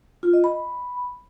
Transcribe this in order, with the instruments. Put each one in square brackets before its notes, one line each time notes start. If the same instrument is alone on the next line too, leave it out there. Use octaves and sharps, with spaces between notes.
[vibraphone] F4
D#5
B5